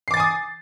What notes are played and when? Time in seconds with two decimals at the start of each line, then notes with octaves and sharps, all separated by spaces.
0.08 C7
0.11 D6
0.14 A6
0.17 G#5
0.20 D#6